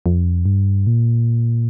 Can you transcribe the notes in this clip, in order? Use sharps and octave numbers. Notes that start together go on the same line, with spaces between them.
F2
G2
A#2